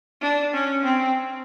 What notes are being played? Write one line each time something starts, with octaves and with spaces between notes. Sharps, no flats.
D4
C#4
C4